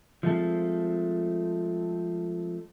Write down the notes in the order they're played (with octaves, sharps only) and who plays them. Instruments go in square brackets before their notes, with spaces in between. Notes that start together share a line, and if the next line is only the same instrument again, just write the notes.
[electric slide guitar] F3 G#3 A3 C4 D4 A4